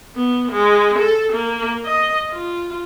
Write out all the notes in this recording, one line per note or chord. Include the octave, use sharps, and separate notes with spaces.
B3
G#3
A4
A#3
D#5
F4